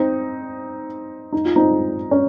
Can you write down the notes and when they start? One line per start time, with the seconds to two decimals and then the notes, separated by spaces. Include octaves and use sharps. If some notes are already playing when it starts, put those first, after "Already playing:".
Already playing: C4 D#4
1.32 D#4
1.45 F4
1.56 C4 D#4
2.11 C#4